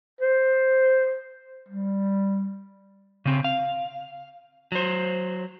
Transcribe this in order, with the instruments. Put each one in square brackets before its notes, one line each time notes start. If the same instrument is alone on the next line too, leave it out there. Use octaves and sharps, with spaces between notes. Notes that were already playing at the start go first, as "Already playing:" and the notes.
[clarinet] C5
G3
[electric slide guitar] C#3 C4
F5
F#3 C5